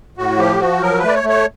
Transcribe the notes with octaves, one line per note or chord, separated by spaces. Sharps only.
A2 F#4
F3 G4
F3 F#4
F#3 A#4
B4
A3 D5
C#5
A3
C#5